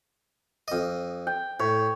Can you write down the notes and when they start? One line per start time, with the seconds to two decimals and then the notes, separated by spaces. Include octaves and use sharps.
0.68 F2 D#5
1.27 G5
1.60 A2 C#5